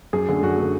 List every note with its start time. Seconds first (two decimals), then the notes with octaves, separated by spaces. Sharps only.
0.13 F#2 G#4
0.29 D3 A3
0.42 F#2 F#4
0.57 D3 A3